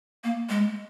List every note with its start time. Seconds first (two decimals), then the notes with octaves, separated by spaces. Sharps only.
0.24 A#3
0.49 G#3